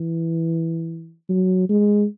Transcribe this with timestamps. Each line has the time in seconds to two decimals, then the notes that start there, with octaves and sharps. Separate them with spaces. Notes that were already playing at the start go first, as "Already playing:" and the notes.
Already playing: E3
1.29 F#3
1.69 G#3